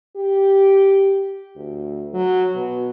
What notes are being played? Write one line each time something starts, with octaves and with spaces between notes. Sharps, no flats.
G4
D2
F#3
B2